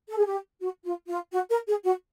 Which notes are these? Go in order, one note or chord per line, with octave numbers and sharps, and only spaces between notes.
A4
G#4
G4
F#4
F4
F4
F#4
A#4
G#4
F#4